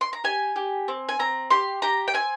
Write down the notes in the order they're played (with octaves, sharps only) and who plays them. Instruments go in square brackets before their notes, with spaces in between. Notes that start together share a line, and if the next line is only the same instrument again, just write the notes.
[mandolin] C6
A#5
G4 G#5
G4
C4
G#5
C4 A#5
G4 C6
G4 A#5
G5
C4 G#5